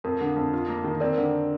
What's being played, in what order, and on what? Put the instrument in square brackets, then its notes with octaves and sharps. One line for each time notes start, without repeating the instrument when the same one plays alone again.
[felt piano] F2 [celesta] A#4
[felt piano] D3
F2
F4
A#3
D#3
[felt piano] C4 [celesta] A#4 D5
[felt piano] D3